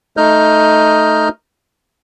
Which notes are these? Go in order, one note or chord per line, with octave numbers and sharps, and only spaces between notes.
A3 D#4 D#5 F6 G6